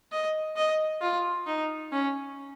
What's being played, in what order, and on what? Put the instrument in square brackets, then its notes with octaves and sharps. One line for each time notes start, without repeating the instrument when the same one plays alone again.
[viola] D#5
D#5
F4
D#4
C#4